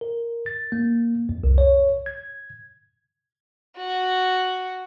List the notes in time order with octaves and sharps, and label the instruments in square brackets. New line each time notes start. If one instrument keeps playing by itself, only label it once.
[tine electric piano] A#4
A6
A#3
F2
C2
C#5
G#6
[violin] F#4